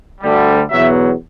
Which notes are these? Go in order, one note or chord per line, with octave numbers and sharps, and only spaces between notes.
D2 D3 G3
E2 B2 F#3 B3 E5